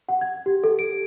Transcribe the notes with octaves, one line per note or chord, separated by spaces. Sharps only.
F#5
G#6
G4
A4
D7